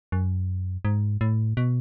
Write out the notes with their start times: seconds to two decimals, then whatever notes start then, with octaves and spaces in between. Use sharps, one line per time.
0.12 F#2
0.85 G#2
1.21 A2
1.57 B2